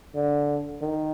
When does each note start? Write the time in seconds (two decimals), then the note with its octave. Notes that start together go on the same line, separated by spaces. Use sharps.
0.14 D3
0.82 D#3